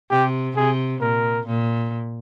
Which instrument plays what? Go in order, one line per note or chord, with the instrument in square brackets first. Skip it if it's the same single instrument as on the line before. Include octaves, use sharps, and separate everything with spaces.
[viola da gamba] C3 [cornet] G4
[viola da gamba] C3 [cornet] G#4
[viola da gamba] A#2 [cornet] A#4
[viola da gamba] A#2